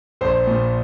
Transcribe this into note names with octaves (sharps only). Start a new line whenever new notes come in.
A#1 C5
A#2